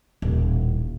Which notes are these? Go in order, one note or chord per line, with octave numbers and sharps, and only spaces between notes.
D#1 A1